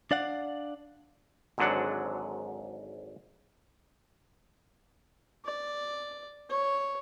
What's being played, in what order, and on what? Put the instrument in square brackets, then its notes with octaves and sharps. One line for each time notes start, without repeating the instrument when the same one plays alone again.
[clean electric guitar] D4 D5 F5 F#5
[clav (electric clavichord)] G#1 G#2 D3 F#3 D4 F#5
[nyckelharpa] D5
C#5